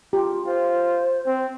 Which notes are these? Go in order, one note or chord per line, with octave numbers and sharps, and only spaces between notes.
F4 G4
F4 C5
C4